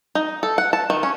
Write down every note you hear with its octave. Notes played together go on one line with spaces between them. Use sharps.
D#4
A4
F#5
A5
D#3
C#4